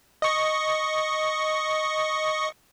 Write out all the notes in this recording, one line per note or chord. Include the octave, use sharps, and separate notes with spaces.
D#5 C#6